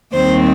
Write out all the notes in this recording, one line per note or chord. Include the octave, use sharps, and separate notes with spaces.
D#2 D#3 G3 C4 C5